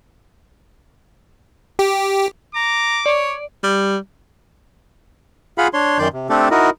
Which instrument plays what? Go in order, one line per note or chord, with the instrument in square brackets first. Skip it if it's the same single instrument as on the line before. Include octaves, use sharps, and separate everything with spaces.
[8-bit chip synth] G4
[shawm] A#5 [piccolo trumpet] D6
[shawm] C#5 [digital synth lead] D5
[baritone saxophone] G3
[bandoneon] F4 G#4 F5 F#5 B5
D4 C#5 C6
F#2 D#3 D5 C6 G6
C3
A3 C4 D4 G4 A4
D#4 E4 F#4 A#4 D#5